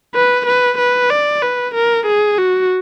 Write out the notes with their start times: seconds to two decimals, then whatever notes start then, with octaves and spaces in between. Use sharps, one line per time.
0.14 B4
0.46 B4
0.78 B4
1.10 D5
1.42 B4
1.74 A#4
2.06 G#4
2.38 F#4